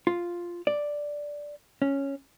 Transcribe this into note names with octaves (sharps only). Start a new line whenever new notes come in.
F4
D5
C#4